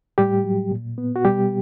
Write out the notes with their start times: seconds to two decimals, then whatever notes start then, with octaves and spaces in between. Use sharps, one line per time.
0.18 A2 G3 G4
0.44 F#3
0.71 A#2
0.98 B3
1.16 F#4
1.25 B2 G3 G4